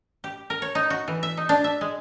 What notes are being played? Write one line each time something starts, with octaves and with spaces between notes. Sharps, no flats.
G4
A#4
C#5
D#4
F#4
E3
E5
D#4
D4
E5
G#3